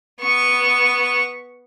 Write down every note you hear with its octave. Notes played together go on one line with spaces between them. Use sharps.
B3 C#6